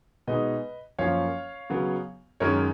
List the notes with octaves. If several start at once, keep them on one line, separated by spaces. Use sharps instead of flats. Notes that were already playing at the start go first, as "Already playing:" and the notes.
B2 G#3 D#4 B4 D#5
F#2 F3 A#3 C#4 C#5 F5
C#3 F#3 B3
F#2 D#3 G#3 C#4 A#4 C#5